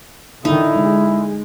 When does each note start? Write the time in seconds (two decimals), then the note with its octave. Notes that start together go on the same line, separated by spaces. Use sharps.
0.45 D3 D#3 D#4 E4
0.80 G#3